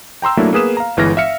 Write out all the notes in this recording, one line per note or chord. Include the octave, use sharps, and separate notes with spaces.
G5 A#5 C6 E6
F#3 A3 A#3 D4 E4
A#3 B3 G#4 B4 D#6 E7
F5 A#5
G1 E3 G#3 F6 A#6
E5 F5 F6 C#7